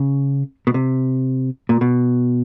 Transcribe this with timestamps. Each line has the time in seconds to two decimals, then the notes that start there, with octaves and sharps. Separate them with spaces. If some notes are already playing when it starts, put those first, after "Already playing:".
Already playing: C#3
0.67 B2
0.74 C3
1.69 A#2
1.81 B2